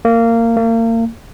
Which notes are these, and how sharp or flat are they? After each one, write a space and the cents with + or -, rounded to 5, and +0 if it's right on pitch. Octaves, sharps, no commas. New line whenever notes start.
A#3 -20
A#3 -35